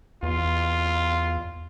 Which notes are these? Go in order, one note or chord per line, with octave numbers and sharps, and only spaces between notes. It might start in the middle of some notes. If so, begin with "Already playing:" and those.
E2 F4